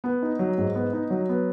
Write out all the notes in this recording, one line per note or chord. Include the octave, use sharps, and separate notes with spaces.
B3
D#4
F#3
G#2
B3
D#4
F#3
B3